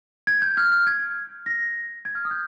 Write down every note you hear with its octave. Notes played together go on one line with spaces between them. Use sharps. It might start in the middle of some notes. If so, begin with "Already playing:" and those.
G#6
G6
F6
F6
G#6
A#6
G#6
F6
D#6
G6